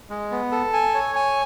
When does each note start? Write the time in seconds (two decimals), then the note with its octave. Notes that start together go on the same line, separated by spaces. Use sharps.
0.10 G#3
0.31 B3
0.52 A4
0.73 G#5
0.94 C#5
1.16 G#5